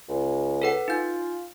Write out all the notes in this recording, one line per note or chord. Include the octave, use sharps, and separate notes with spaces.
C#2
A4 B4 F#5
D#4 F4 G6